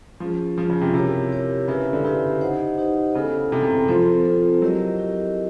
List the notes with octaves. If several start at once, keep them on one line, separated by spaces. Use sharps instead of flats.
F3 C#4 F4 G#4
F3 C#4 F4 G#4
C#3
C3
C3 E4 G4 A#4 C#5
E4 G4 A#4 C#5
C#3 E4 G4 B4 E5
D3
C#3 E4 G4 B4 E5
D#4 G4 C5 D#5 F#5
D#4 G4 C5 D#5 F#5
C#3 B3 E4 A4
C3 B3 E4 A4
C3
F3 C4 F4 A4 C5
C4 F4 A4 C5
F#3 E4 G4 A#4 D#5
E4 G4 A#4 D#5